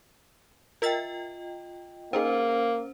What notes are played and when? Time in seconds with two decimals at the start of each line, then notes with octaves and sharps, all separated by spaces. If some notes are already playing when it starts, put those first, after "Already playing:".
0.82 F4 A#4 D#5 E5 G5 A6
2.13 A#3 C4 C#4 D#4 G#4 C5